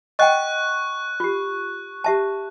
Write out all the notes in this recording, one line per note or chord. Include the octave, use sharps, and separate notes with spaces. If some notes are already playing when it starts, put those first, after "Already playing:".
D#5 F#5 G5 C#6 F#6
F4 G4
G4 E5 A5